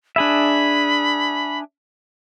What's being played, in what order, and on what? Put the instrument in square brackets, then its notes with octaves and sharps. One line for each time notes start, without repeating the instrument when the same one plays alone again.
[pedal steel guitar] D4 G#4 E5 [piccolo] B5